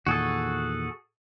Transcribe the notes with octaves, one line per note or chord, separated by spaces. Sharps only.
E2 A#2 D#3 F#4 G#4 A4